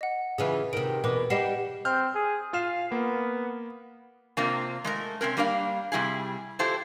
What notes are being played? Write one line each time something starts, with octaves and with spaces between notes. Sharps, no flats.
D#5 F#5
C#3 E3 F4 G#4 B4 E5
C3 D#3 D7
E2 B2 A#3 B4 D6
G3 D#4 G4 F#5 C7 E7
C4 F6 G6
G#4
F4 F5 F6 E7
A#3 B3
C3 A#3 C4 D4 F4
G#3 A3 A#4
C3 C4 C#4 A#4
G3 A#3 D4 A#4 F5
C3 G3 E4 G#4
E4 F4 G4 A4 C5